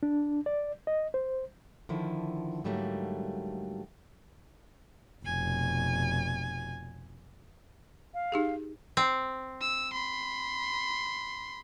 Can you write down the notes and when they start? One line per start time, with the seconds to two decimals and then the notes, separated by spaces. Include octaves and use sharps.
0.03 D4
0.46 D5
0.87 D#5
1.14 C5
1.89 D3 D#3 F3 E4
2.64 G#2 D3 F#3 G3 A3 A#3
5.25 F1 B2 G#5
8.14 F5
8.32 D#4 G4 G#4
8.97 C4
9.61 E6
9.93 B5 C6